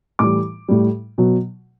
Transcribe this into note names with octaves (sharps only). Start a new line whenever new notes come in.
A2 E3 G3 D6
A2 G3
B2 F#3